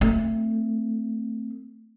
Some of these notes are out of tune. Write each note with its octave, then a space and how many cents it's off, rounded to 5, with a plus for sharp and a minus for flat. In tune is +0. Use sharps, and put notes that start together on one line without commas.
A3 +20 C4 +0